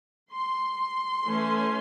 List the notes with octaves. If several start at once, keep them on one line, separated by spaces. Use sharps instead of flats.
C6
E3 A3 C#4